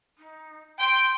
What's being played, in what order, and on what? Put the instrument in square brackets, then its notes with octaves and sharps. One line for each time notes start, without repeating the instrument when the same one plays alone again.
[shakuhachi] D#4
[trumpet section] G5 [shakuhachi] C6